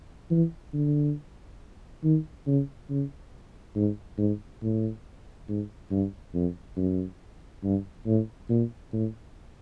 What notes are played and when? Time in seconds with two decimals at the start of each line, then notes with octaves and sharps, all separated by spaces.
0.31 E3
0.74 D3
2.04 D#3
2.47 C#3
2.90 C#3
3.76 G#2
4.18 G#2
4.62 A2
5.48 G#2
5.91 G2
6.34 F2
6.77 F#2
7.64 G2
8.06 A2
8.50 A#2
8.93 A2